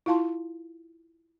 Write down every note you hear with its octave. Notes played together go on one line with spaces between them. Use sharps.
E4 F4 F5 A5 C6